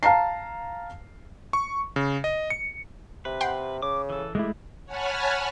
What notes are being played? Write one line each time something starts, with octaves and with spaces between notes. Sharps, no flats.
F5 A5 A#5 C7
C#6
C#3
D#5
C#7
C3 B4
F#5 G5 C6
C#3 D6
E3 A4
E3 G#3 A3 E4 G4
C#5 F#5 G#5 A5 B5 F6